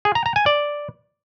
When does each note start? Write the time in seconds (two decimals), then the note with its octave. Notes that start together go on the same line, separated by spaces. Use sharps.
0.05 G#4
0.15 A#5
0.26 A#5
0.36 G#5
0.46 D5